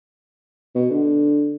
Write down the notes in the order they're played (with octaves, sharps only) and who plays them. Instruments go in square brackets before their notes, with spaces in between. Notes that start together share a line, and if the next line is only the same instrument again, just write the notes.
[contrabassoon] B2
D3